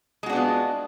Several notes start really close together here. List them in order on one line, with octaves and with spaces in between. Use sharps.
G#3 F#4 D4 B3 F4